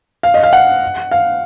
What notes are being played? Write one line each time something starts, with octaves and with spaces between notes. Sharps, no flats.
F5
D#5
F5
F#5
F5